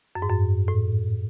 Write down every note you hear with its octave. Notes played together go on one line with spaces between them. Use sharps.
F#2
G#2
F#2
A2